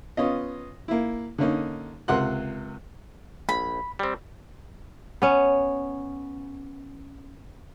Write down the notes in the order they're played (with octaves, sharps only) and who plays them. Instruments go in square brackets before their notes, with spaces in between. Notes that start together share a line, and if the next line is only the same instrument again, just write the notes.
[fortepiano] B3 C#4 F4 D#5
A#3 E4
D3 A#3 C#4 D#4
C#2 C3 A#4 F#5 C6 F#6
[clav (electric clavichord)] A#1 [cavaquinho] B5
[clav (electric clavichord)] G3 C4
[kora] B3 C#4